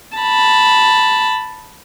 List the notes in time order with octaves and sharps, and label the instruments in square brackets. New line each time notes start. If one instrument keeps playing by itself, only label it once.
[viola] A5 B5